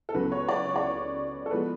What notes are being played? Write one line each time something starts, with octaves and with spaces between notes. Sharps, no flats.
A4
C#2 C#3 F#3 B3 B4
C#5
D5
C#5
D5
C#5
A4
F3 G#3 B3 B4